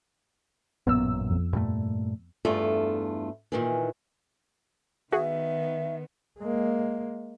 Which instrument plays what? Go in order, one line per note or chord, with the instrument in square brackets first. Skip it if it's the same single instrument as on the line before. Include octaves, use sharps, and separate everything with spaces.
[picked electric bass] A1 F#2 A#2 [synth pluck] B3 E6
[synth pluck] F2
[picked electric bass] G2 A#2 A3
[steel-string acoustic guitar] E2 G2 A3 F4
A#2 D#3 E3
[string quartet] D#3 B3 [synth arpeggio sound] F#4 G#4 [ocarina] E5
[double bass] G#3 A#3